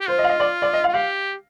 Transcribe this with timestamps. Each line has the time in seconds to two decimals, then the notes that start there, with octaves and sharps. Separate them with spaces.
0.01 G4
0.08 F4 C5
0.19 D#5
0.24 F5
0.29 D#5
0.40 D5
0.62 D5
0.73 D#5
0.84 F5
0.88 F4
0.94 G4 F5